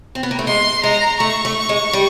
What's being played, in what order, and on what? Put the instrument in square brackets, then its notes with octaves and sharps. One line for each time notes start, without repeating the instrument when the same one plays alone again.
[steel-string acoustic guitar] C4
B3
A#3
A3
[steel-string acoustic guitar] G#3 [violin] C6
[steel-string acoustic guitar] G#3 [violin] A#5
[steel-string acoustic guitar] A3 [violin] C#6
[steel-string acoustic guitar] A3
G#3
G3